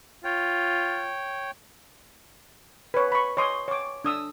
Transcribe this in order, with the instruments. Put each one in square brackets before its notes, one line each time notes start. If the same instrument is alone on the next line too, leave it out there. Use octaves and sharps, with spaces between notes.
[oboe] F4 [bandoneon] C#5 G5
[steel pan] B4 C#5
B5 C#6
C#5 D#5 C6 D#6
C#5 D6
D4 D#6 E6